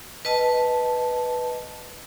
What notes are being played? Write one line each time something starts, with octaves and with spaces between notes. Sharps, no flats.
B4 D#5 A5